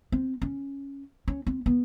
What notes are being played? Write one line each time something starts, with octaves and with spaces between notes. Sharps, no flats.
C4
C#4
C#4
C4
B3